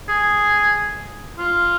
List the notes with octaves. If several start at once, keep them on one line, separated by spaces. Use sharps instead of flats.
G#4
F4